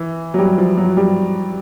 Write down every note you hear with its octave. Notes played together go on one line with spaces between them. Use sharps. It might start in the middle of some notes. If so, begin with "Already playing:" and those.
Already playing: E3
F#3
G3
F3
F#3
G3